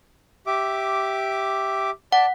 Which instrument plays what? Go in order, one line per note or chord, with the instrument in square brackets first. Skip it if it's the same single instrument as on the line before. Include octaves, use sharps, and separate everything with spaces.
[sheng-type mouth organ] G4 E5 D6
[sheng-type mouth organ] D5 A5 [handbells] F#5